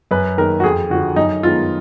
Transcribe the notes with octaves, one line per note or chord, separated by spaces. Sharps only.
F#2 B4
D#3 A#3 A#4
F#4
F2 G#4
D3 F3 F#4
F#2 D#4
D#3 G#3 B3 F4